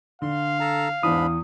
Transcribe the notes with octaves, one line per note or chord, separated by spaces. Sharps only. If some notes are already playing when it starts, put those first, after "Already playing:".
D3 F5 C6
A4 A5 A#5
E2 G#2 E3 D4 B5 D#6